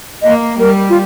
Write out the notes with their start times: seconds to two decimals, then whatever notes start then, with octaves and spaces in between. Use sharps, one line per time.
0.22 A#3 D#5
0.59 G3 A#4
0.90 F4